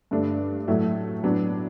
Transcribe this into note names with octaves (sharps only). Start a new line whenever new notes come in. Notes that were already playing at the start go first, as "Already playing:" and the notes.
G2 D3 A3 D4
A2 F#3 A3
A2 F#3 B3 D4